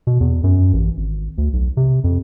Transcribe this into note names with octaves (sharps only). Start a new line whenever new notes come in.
B2
E2
F#2
A1
G#1
D2
B1
C3
F2